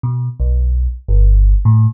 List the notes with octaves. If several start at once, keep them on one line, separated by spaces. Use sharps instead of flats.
B2
B1
G1
A2